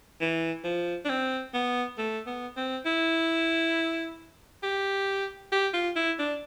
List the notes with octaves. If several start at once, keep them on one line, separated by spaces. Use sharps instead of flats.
E3
F3
D4
C4
B3
A3
B3
C4
E4
G4
G4
F4
E4
D4